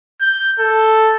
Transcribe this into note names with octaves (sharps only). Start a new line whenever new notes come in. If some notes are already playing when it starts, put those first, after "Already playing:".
G6
A4